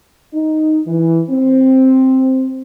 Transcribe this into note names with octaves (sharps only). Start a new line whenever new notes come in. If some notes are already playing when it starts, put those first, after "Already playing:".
D#4
E3
C4